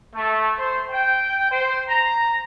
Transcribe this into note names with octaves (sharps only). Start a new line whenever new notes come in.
A3
C5
G5
C5
A#5